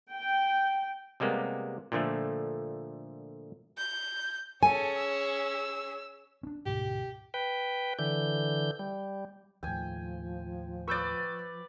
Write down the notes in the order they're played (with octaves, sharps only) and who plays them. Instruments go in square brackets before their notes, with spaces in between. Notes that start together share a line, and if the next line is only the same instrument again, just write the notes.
[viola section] G5
[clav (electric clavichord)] C3 G3 G#3 A#3 B3
A#2 D3 F3 A3
[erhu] G6
[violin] C#4 G#4 [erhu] A4 [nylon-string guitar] G#5
[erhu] E6
[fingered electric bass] C#4 D4
[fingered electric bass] D2 G#2 B2 [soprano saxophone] G4
[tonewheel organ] B4 G5
D3 E3 G6
G3
[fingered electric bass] D#2 A2 [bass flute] F3 [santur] G5 G#5
[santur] B4 D5 [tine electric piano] C#6 E6 G6